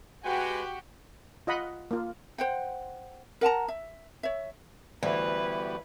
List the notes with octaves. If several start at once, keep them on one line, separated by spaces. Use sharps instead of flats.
G#3 F#4 G4 B4 G5 G#5
F4 D#5 F#5 B5
A#3 F4
C5 F#5 G5
A#4 F#5 A5 A#5
E5
C#5 E5
D2 E3 G3 B3 F#4 B4